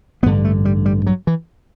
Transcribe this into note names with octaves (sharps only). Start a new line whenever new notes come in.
A1 G2 D3 B3
A3
G3
G3
F#3
E3